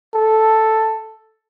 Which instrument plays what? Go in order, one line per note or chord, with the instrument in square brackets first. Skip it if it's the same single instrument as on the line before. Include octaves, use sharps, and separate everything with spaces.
[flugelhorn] A4